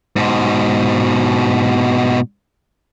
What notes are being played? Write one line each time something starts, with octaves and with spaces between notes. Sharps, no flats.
G#2 B2